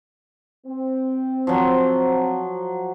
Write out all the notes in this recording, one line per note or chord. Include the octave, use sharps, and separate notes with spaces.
C4
F3 F#3